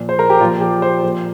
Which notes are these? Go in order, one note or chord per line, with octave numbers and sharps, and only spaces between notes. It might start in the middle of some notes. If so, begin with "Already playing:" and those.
Already playing: A#2 F3
C5
A#4
G4
A#2 F3 F4
G4
C5
A#2 F3